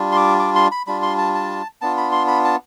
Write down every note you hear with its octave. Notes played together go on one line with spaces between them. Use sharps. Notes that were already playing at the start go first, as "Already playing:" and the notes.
Already playing: G3 D4 F4
C6
D6
D6
C6
B5
G3 D4 F4 B5
C6
A5
A5
B3 D4 F4 A5
B5
C6
B5
A5